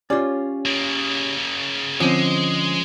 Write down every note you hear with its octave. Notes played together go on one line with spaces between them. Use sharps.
C#4 F4 G4 C#5 D5
C#3 A#3
D3 F3 G#3 C4 C#4 D#6